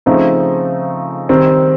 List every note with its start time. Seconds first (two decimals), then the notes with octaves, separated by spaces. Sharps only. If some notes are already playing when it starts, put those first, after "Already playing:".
0.06 C#3 F3 A3 C4 D#4
1.29 D#3 G3 C4